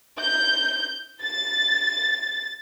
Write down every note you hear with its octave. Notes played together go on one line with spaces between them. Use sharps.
G6
A6